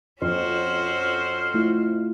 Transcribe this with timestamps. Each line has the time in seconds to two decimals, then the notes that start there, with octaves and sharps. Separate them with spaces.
0.22 F2 C#4 F#4 A4 C5 C6 F6
1.54 A3 E4 F4